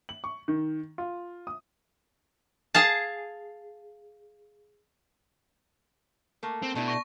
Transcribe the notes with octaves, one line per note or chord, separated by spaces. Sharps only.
F#7
C#6
D#3
F4
D#6
G#4 F5 A5
A3 A#3
C4
B2 A3 D4 E4
C#6 A#6